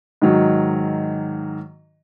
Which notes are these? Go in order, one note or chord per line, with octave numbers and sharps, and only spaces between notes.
G#2 D#3 F#3